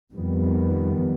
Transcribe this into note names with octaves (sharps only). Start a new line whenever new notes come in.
F2 D#3 G3 B3